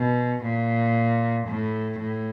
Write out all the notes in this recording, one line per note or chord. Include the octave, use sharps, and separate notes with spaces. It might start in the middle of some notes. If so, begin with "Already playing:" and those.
Already playing: B2
A#2
A2
A2